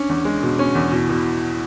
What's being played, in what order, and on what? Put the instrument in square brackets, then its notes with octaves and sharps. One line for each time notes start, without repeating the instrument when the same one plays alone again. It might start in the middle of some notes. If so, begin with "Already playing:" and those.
Already playing: [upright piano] C#4 [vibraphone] D4
[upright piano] E2
G#3
B2
C#4
E2
[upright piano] B2 [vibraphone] E4
[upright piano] B2